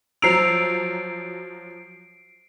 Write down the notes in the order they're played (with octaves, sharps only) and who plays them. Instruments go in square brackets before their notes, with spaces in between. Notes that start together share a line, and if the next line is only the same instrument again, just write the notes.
[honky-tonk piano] F3 F#3 F7 [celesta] C5 A#5 E6 [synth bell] C7 D7